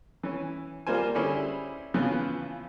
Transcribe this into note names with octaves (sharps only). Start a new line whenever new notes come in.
E3 C#4
G3 A#3 F4 C5 G#5
D3 G3 C#4 E4 G#4 C5
C#3 E3 F3 B3 C#4